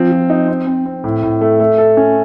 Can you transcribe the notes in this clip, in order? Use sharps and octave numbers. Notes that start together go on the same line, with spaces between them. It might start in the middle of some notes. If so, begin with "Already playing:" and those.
Already playing: F3 C4
F3
D#4
C4
C4
C4
A2
A2
A3
A3
A4
C#4